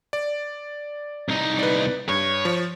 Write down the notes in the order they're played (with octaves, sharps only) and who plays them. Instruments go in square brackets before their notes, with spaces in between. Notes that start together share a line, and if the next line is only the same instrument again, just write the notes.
[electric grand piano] D5
[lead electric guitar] C2 D#4
[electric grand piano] B4 D5
[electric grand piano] G2 [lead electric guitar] C#5
[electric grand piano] F3